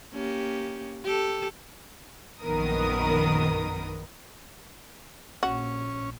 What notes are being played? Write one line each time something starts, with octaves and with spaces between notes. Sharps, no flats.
A#3 C#4 G4
G4 A4
A#1 F#2 D#3 B3 A#4 D#6
A#1 C#4 F#4